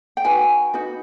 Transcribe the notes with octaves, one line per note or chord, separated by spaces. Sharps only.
G5
D#4 F#4 B4 G#5
D#4 F#4 B4